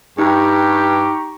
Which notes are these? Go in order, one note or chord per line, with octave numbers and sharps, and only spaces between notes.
G2 D#4 G4 G5 A#5 C#6